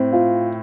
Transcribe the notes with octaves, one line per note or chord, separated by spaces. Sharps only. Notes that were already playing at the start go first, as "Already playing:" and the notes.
Already playing: A2 C4
F4